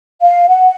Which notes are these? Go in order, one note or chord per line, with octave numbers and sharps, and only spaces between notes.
F5
F#5